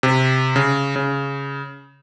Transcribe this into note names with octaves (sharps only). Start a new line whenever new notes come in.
C3
C#3
C#3